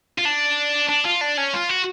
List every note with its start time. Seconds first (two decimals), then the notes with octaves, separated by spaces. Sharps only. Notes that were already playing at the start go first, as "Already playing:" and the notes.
0.18 F4
0.25 D4
0.89 D4
1.05 F4
1.21 D4
1.38 C#4
1.54 F4
1.70 F#4